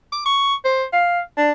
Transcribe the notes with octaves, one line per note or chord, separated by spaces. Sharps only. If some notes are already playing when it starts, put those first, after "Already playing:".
D6
C#6
C5
F5
D4